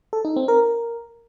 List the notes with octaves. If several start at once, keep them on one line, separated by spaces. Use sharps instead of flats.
A4
D#4
C4
A#4